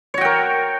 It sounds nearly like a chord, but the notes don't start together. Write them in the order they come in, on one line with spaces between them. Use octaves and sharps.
C#5 F#4 G5 A#4